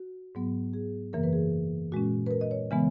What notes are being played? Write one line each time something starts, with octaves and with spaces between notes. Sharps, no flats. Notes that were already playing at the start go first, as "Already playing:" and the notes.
Already playing: F#4
G#2 F#3 B3
G#4
F#2 C#3 E3 A#3 A#4
B4
G#4
A#2 G#3 C#4 F#4
B4
A#4
D#5
C#5
C#3 E3 G#3 B3 G#5